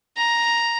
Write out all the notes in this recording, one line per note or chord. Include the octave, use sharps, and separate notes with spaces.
A#5